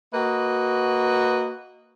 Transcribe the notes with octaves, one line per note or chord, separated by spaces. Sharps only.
A#3 F#4 B4 D#5